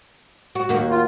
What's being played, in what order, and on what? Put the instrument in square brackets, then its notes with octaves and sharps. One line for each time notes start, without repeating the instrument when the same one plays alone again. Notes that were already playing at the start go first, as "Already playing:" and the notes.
[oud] F#4
D#2 A#3 F#4
[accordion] F4